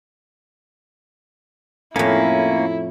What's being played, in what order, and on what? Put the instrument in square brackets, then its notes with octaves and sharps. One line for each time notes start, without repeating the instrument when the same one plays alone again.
[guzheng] F2 A2 [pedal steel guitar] A#3 C#4 [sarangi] E4